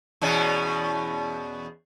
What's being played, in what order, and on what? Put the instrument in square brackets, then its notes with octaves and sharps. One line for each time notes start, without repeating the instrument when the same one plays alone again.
[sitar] E2 B2 C#4